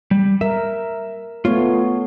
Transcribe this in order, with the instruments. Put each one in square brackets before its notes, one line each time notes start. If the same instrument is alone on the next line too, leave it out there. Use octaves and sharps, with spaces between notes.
[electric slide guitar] G3
[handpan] A#4 [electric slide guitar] E5
[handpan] A3 B3 C#5 [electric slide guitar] F4